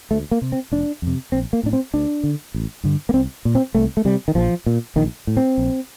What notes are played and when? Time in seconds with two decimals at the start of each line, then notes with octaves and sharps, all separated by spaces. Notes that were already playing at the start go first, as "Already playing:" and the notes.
0.11 D2 A3
0.31 A#3
0.42 C3
0.52 C4
0.72 F1 D4
1.02 F2 C3
1.32 A#1 C4
1.53 A#3
1.63 A2 D4
1.73 C4
1.94 D2 D4
2.23 D3
2.54 A1
2.84 G2 D3
3.09 A#3
3.14 C2 C4
3.45 A#2
3.55 C4
3.75 C2 A3
3.97 A3
4.05 C3 G3
4.28 D#3
4.35 A#1 F3
4.66 A#2
4.96 A#1 D#3
5.27 A2
5.37 C4
5.58 A#1